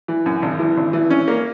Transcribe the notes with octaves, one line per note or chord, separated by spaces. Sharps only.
E3
F#2
G#1
E3
G#1
E3
C#4
A#3